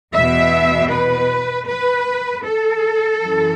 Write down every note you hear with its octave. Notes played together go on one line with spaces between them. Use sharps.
E2 B2 E5
B4
B4
A4
F#2 E3